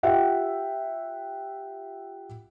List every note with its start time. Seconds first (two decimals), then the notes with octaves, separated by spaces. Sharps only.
0.03 F4 G4 E5 F#5 G5